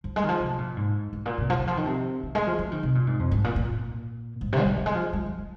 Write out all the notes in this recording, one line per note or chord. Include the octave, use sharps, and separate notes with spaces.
F3
G#3
D#3
F3
C3
A#2
G#2
G#2
A#2
C3
F3
D#3
F3
D#3
C3
D#3
G#3
F3
F3
D#3
C3
A#2
G#2
F2
G#2
A#2
A#2
G#2
C3
G#3
F3
F3
G#3
F3
G#3
G#3
F3